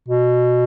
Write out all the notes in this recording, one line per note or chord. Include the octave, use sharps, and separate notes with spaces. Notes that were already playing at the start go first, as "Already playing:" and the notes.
B2